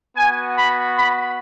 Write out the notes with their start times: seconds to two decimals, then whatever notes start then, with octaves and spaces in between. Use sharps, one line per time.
0.17 B3 F#4 G#5
0.56 B5
0.95 B5